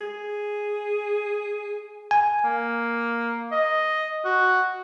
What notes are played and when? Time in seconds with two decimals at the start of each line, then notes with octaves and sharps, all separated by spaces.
0.01 G#4
2.11 G#5
2.44 A#3
3.52 D#5
4.25 F#4